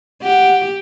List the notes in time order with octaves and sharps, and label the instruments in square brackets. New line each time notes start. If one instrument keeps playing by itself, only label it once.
[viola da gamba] G4 [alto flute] F#5